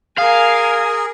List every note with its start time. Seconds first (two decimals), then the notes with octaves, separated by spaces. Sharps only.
0.18 G#4 A#4 F5 G#5